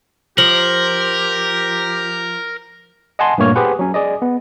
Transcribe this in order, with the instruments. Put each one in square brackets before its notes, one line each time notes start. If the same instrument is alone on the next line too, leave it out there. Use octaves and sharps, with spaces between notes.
[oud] F3 [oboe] G4 [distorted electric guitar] A#4 [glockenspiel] F#7
[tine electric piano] D#5 F#5 G#5 A5 C6
G2 A#2 A3 A#3 C#5 F6
G4 G#4 B4 C5 F#5
F#3 C#4
G#4 D5 D#5
B3